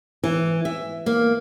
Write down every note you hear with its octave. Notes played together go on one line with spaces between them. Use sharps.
E3
E5
A#3